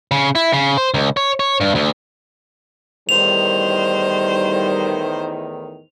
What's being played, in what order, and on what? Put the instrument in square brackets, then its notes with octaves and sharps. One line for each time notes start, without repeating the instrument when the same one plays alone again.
[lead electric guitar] C#3
E4
C#3
C5
C#2
C#5
C#5
G2
D2
[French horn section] E2 A2 D#3 [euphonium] G3 [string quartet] C5 [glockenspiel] F7